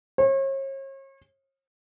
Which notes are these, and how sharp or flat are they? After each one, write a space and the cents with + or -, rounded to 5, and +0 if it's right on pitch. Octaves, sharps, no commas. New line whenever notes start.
C#5 -40